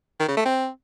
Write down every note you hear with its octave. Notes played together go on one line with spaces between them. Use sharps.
D#3
C#3
A3
C4